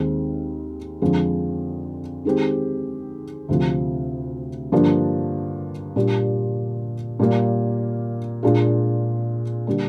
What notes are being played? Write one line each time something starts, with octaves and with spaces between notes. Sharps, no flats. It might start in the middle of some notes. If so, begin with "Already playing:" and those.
Already playing: D#2 D#3 G#3 C4 D#4
F2 D3 F3 G#3
D#3 G#3 C4 G4
D2 C3 F3
G2 D3 F3 A#3 D4
A#2 G3 D4 G4
A#2 G3 A#3
A#2 G#3 D4 F4
D3 G3 A#3 D4